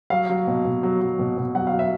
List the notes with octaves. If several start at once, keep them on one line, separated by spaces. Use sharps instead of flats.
F#3 F5
F#3
B2
B2
F#3
F#3
B2
B2
F#3 F#5
F5
F#3
E5